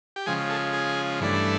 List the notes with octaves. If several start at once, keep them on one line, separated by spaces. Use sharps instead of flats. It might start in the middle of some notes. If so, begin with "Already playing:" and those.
G4
C#3 F3 G#3 G#4
A4
G#4
G2 E3 A3 D4